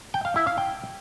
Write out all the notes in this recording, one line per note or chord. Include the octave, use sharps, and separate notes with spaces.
G5
F5
E4
F5
G5